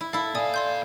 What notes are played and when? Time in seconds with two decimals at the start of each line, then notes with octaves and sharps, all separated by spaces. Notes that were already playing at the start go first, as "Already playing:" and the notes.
0.01 E4
0.13 E4 A4 F5
0.35 A#2 D5 F5 G#5 D#6
0.54 D5 C6 G6